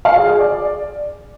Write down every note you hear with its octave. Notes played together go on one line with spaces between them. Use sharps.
F5
G#4
G#4
D5